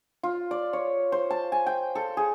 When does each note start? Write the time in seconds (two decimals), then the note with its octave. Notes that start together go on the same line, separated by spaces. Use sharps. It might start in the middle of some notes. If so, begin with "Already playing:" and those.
0.23 F4
0.51 D5
0.73 C#5
1.12 C5
1.31 A5
1.52 G#5
1.66 G5
1.95 A4
2.17 G#4